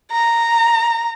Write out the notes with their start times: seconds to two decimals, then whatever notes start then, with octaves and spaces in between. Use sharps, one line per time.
0.12 A#5